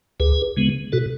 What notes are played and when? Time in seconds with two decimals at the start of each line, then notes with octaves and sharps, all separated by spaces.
0.20 D2 G#4 B4
0.57 C#3 G#3 B3
0.92 B2 F#4 A4